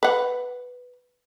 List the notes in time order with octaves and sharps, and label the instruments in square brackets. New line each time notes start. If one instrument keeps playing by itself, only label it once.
[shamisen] B4 F#5